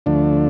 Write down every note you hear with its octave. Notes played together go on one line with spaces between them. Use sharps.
D2 D3 F3 A3 D4